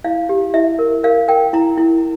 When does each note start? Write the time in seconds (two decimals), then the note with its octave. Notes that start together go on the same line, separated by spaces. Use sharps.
0.04 E4 F5
0.29 G4
0.54 E4 E5
0.79 A#4
1.03 A#4 F5
1.28 A#4 G5
1.53 E4 A#5
1.78 E4